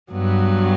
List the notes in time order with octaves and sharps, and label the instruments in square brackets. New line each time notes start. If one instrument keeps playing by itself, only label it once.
[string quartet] G2 F#3 B3